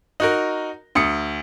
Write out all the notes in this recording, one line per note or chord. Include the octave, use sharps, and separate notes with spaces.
D#4 F#4 A#4
D2 D#6 C#7